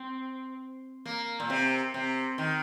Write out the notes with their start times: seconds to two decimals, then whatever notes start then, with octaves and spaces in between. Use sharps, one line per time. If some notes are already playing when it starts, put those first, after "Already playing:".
Already playing: C4
1.05 A#3
1.40 A#2
1.50 C3
1.94 C3
2.38 D#3